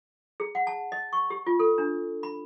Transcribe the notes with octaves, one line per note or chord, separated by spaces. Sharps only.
G#4
F#5
A5
D#5
C#6
G4
F4
A4
D4
B5